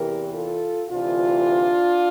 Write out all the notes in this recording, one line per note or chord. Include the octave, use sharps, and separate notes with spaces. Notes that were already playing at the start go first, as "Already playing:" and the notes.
Already playing: E2 C3 E3 G4 A#4
F4 A4
D2 C3 E3 D4 F4